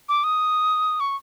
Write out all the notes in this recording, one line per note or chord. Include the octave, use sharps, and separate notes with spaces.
D6
D#6
C#6